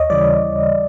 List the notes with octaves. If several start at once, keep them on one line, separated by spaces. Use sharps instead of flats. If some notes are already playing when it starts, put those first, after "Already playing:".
Already playing: D#2 C#5 D#5
C#3 E3 G3 D5